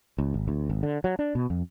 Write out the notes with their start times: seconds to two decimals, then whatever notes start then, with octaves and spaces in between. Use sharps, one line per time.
0.18 C#2
0.34 G#1
0.48 D2
0.70 G#1
0.83 D3
1.04 F#3
1.19 D4
1.35 B2
1.50 F2